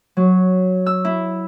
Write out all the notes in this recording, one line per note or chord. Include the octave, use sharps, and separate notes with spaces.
F#3
E6
E4